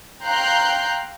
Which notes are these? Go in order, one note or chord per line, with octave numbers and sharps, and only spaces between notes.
F5 G5 A#5 C6 F#6 G6